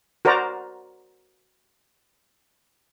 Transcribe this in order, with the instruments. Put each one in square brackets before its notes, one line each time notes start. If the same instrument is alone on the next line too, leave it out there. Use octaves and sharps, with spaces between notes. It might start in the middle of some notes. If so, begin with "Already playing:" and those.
[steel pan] F#4 A#4 C5 D5 A#5